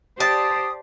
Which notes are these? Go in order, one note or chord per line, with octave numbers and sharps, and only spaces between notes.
G4 C5 D5 A5 D#6